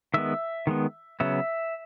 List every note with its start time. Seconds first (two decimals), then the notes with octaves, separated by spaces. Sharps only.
0.14 D#3 G#3 B3 E5
0.67 D#3 G#3 B3
1.20 C#3 F#3 B3 E5